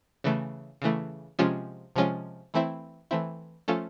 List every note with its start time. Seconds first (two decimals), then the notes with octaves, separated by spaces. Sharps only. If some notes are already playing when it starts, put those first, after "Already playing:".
0.24 C#3 E3 A3
0.82 C#3 E3 A3
1.39 C3 F3 G#3 C#4 F4
1.96 C3 F3 G#3 C#4 F4
2.54 E3 A3 C4 E4
3.11 E3 A3 C4 E4
3.68 F3 A3 C#4 F4 A4